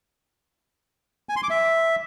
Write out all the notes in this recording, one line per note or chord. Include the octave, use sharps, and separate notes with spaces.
G#5
C6
D6
E5